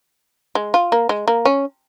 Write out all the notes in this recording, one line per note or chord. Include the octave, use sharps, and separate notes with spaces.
G#3
F4
A#3
G#3
A#3
C#4